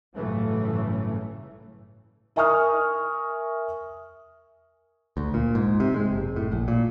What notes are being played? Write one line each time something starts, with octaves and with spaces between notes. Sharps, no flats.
G1 A2 C#3 E3 F#3 A3
A#4 E5 G#5 C#6 D#6 F6
D2
A#2
G#2
C3
G#3
F#1
A2
A#1
A#2